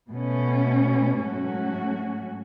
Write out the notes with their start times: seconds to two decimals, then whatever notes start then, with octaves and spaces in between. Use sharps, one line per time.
0.10 B2 A3 C#4
1.17 G#2 F#3 A3 C#4 F#4